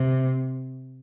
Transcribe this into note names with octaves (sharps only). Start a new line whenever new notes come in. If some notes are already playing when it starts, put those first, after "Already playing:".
Already playing: C3